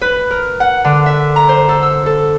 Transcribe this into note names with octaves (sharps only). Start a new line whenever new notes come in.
B4
A#4
F#5
D3
E5
A#5
C5
A4
E6
A4